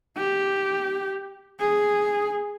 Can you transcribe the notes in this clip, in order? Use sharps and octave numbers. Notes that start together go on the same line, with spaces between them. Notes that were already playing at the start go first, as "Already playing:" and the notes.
G4
G#4